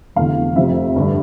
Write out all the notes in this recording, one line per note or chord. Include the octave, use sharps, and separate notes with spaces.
F1 E2 D3 F5
F1 F2 C3 F3 C4 E5
G2 D3 G3